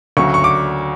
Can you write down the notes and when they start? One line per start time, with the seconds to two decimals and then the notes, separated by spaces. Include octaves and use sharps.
0.17 D2 C#3 F#3 C#6
0.34 C#6
0.44 D6